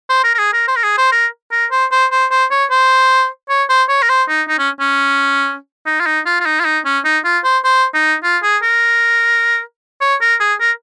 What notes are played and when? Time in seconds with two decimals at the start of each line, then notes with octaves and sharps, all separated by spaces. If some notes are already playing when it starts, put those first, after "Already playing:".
0.10 C5
0.24 A#4
0.34 A#4
0.39 G#4
0.53 A#4
0.68 C5
0.76 A#4
0.83 G#4
0.98 C5
1.12 A#4
1.52 A#4
1.71 C5
1.92 C5
2.12 C5
2.31 C5
2.51 C#5
2.71 C5
3.50 C#5
3.69 C5
3.89 C#5
4.02 A#4
4.09 C5
4.29 D#4
4.48 D#4
4.59 C#4
4.80 C#4
5.86 D#4
6.00 F4
6.06 D#4
6.26 F4
6.40 F4
6.46 D#4
6.60 F4
6.65 D#4
6.85 C#4
7.05 D#4
7.25 F4
7.44 C5
7.64 C5
7.94 D#4
8.24 F4
8.43 G#4
8.63 A#4
10.01 C#5
10.21 A#4
10.40 G#4
10.61 A#4